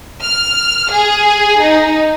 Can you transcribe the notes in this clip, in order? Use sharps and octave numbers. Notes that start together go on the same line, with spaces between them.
F6
G#4
D#4